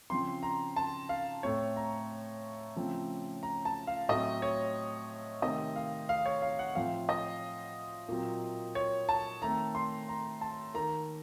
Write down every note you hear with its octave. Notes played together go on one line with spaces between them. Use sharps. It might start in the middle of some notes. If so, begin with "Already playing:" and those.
C#3 F3 C4 C6
A#5
A5
F5
A2 A3 C4 C#5
A#5
C#3 F3 A3 C4
A#5
A5
F5
A2 F#3 A3 C4 D#5
C#5
C3 D#3 A3 C4 D#5
F5
F5
C#5
F5
F#5
A2 F3 C4 F5
D#5
A#2 F#3 C4
C#5
A5
D#3 A3 C4 A#5
C6
A#5
A5
D#3 A#3 A#5